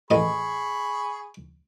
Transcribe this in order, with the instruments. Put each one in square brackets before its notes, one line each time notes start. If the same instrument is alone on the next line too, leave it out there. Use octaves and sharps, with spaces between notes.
[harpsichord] A1 D#5 [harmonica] G#4 B5 C#6